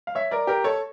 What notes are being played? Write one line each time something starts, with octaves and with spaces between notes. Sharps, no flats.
F5
C#5 E5
A#4 D5
G4 A#4
A4 C#5